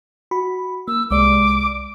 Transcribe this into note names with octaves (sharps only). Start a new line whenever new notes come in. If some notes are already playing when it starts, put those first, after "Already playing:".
F#4 B5
A#3 E6
C2 G#3 D5 D6